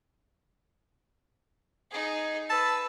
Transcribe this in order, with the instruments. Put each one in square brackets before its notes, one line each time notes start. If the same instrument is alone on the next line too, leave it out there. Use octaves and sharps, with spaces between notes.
[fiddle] D#4 G#4
[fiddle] B4 [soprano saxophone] A5 [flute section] E6